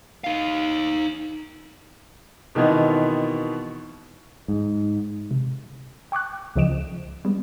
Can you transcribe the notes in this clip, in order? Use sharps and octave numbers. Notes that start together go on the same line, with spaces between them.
D#4 F5
B2 D#3 E3 B3 C4
G#2
C3
G5 C#6 D6 F#6
C#2 C#3 F3 D#5 D7 E7
G3 G#3 B3